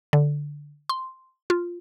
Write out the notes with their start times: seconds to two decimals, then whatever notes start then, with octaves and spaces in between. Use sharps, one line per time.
0.13 D3
0.89 C6
1.50 F4